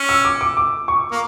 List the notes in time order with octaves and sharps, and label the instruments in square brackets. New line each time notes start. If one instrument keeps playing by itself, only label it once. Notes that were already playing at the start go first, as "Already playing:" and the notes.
Already playing: [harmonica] C#4
[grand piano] E6
D6
D6
D6
C#6
[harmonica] A#3